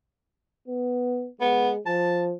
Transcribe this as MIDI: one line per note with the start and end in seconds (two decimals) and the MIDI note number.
0.68 1.29 59
1.41 1.79 56
1.41 1.70 59
1.87 2.35 53
1.87 2.20 81